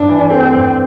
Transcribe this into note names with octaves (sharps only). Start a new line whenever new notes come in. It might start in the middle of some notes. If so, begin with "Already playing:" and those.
Already playing: G2 D4
E3
A3 C4
G2